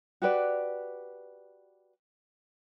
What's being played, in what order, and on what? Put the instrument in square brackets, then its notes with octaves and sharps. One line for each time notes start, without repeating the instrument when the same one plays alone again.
[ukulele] F#4 G4 B4 D5